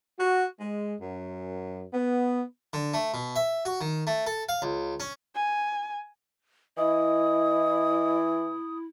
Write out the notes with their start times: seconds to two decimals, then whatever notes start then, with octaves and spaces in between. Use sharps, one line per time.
0.19 F#4
0.60 G#3
1.00 F#2
1.93 B3
2.73 D3
2.94 A3
3.14 B2
3.36 E5
3.65 F#4
3.81 D#3
4.07 A3
4.27 A4
4.49 F5
4.62 C#2
5.00 C#4
5.35 G#5
6.78 E3 E4 D#5 D#6